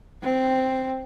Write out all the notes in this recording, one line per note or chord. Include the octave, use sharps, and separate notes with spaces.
C4